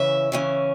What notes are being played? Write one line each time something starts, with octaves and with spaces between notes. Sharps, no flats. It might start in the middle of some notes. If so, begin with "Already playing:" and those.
Already playing: C#3 E3 C#4 E5
C#3 E3 C#4